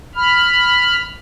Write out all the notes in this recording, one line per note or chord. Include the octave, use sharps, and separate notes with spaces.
B5 F6